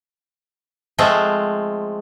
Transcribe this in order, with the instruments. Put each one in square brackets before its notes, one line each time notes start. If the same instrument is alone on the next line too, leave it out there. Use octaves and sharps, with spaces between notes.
[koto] F3 G#3 A3 C4